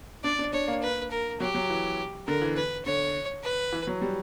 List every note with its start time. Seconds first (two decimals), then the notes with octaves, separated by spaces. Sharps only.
0.24 D4 D5
0.39 D4
0.53 D4 C#5
0.68 A#3
0.82 B4
1.11 A#4
1.40 F#3 G4
1.55 F#3
1.70 E3
2.27 D3 A#4
2.42 E3
2.56 B4
2.86 D3 C#5
3.43 B4
3.72 E3
3.87 F#3
4.01 G3